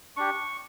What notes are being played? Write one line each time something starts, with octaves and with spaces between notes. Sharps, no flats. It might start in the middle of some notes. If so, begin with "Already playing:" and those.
D4 G4 C#6